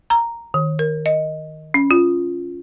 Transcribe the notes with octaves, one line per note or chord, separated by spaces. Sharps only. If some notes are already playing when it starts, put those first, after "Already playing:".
A#5
D#3
A#4
D#5
C#4
F4